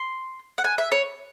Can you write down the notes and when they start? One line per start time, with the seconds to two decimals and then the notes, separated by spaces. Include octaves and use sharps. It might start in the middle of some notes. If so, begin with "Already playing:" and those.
Already playing: C6
0.58 F#5
0.64 G#5
0.78 E5
0.92 C#5